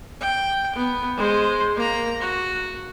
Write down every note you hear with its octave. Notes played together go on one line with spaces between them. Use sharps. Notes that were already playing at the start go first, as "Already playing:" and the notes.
G5
B3
G#3 C5
A#3 A#5
F#4